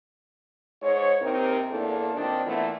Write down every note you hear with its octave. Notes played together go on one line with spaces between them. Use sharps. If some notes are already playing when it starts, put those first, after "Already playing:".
G#2 C#5
D#2 C3 C4 D#4 A#4
E2 A2 A#3 D4 A4
A#2 D#3 C4 D4
A#2 E3 A3 B3